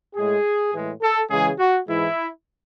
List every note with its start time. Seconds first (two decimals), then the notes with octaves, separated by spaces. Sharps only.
0.15 A2 G#3 G#4
0.73 A2 E3 G#3
1.02 A4
1.30 C#3 E3 G#3 G#4
1.59 F#4
1.88 G#2 E3 G#3 E4